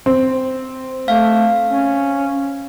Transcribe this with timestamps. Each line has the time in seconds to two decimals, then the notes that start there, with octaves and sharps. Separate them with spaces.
0.06 C4
1.08 A3 F5
1.68 C#4